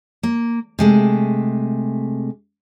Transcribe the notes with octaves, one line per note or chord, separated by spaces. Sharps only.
A#3
C3 G#3 A3